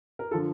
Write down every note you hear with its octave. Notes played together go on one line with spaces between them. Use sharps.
A#4
D3 F3 A4